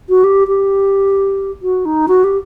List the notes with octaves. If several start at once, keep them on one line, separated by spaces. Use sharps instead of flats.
F#4
G4
G4
F#4
D#4
F#4
G4